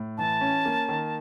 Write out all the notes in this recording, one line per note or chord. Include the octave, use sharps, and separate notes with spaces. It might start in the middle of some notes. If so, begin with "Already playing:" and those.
Already playing: A2
E3 A5
C#4
A#3
D#3